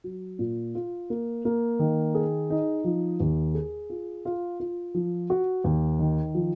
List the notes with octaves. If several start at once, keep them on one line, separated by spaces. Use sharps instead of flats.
F#3
A#2
F4
A#3
A#3
D#3
G#4
D#4
F3
D#2
G#4
F4
F4
F4
F3
F#4
D#2
D#3
F3